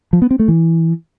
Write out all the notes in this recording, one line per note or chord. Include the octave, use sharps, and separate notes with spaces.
F3
B3
C4
A3
E3